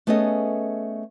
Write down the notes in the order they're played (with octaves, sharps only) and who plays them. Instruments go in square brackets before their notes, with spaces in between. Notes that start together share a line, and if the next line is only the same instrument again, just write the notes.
[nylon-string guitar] A3 B3 C#4 G#4 A4 D#5